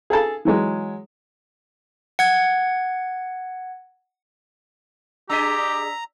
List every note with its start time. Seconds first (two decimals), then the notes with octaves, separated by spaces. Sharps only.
0.10 G#4 A4 A5
0.45 E3 F#3 G#3
2.19 F#5 G#6
5.30 D4 G4 G#4 D#5 A#5 E6 B6